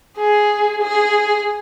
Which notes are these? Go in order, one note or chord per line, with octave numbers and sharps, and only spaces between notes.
G#4
G#4